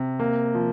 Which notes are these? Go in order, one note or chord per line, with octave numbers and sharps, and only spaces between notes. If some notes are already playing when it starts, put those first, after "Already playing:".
Already playing: C3
A#3
F3